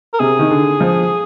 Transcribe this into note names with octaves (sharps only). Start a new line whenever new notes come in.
A#4
C3 G#4
D#3
D3
F3